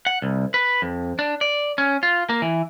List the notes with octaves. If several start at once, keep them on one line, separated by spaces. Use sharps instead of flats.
F#5
C2
B4
F2
D4
D5
C#4
F4
A#3
E3